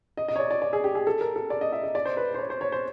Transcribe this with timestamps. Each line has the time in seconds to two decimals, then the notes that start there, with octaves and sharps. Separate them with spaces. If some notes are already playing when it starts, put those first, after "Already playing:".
0.17 D#5
0.28 D#5
0.36 C#5
0.40 D5
0.51 D5
0.62 D5
0.73 G#4
0.84 G4
0.95 G#4
1.07 A4
1.21 A#4
1.36 A4
1.50 D5
1.61 D#5
1.72 E5
1.84 D#5
1.95 D5
2.05 C5
2.17 B4
2.34 C5
2.39 C#5
2.50 C5
2.61 C#5
2.72 C5